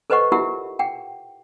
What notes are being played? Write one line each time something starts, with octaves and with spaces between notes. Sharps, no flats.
A4 B4 C5 D#5 F#5 C#6
E4 F4 G4 A#4 E5 F#5
F#5 G5